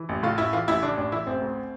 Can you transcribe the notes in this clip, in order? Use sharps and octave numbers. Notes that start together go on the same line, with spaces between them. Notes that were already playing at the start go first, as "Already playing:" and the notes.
Already playing: E3
A1
A2 F4
A1 E4
E3 F4
A1 E4
A2 D4
A1 D4
E3 E4
A1 C4
D2